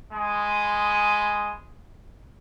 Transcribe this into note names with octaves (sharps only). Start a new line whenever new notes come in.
G#3 G#5 B5 C6 D#6